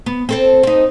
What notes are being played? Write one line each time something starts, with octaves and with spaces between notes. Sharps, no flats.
B3
C4 A4 C5
C4 D#4